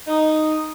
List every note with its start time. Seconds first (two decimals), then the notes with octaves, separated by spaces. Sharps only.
0.07 D#4